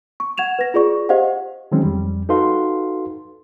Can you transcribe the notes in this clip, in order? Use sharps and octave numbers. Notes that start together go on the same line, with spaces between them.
C#6
F#5 G#6 E7 F7
B4 A#6
F4 G#4 D5 C#6
G4 C5 D#5 F5 F#5
D#3 E3 F#3 G#3 C4 C#4
F2 G3
D#4 F#4 A4 B4 F5 C6